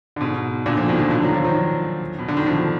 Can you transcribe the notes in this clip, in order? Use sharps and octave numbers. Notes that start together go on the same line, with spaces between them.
D3
G#2 B2
A#2 D3
D3 F3
B2 D#3
D3 F3
D3 F3
D#3 F#3
D3 F3
D#3 F#3
B2
D3
D#3
D3 F3